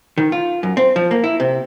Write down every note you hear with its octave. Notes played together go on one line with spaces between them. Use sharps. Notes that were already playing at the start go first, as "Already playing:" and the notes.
D#3
F4
F#2
C4
F3
A#3
E4
C3